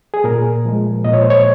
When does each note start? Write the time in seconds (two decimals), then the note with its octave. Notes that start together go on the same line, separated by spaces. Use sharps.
0.14 G#4
0.24 A#2 A#4
0.65 F3 G#3
1.04 A#2 D#5
1.13 C#5
1.22 C5
1.30 C#5